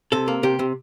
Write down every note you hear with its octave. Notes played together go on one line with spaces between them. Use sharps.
C3 A4
A#3
C3 G4
C3